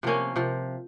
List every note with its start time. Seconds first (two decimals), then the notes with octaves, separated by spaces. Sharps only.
0.03 C3 F3 A#3 C#4
0.36 C3 F3